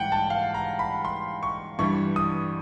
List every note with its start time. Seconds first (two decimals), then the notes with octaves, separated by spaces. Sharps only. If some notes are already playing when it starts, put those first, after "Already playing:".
Already playing: G#2 E3 G3 F#5 G5
0.12 A5
0.30 F5
0.54 A#5
0.79 B5
1.05 C6
1.43 C#6
1.79 G2 E3 G3 C#6
2.16 D#6